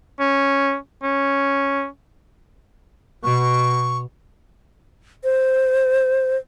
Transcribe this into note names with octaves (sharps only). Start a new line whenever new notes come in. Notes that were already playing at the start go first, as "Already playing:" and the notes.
C#4
C#4
B2 C#6
C5